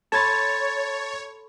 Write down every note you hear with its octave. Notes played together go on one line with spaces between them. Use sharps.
A4 C#5 A5 B5 C6 G#6 A6